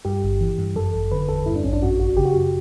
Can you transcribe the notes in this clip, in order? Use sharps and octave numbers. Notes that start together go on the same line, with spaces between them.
G2 G4
G1
E3
G2
F#2 A4
G1
D3 B4
E2 A4
G2 E4
D4
A1 C#4
D4
F#2 F#4
G1 F#4
C#3 G4
F#4
F#2 G4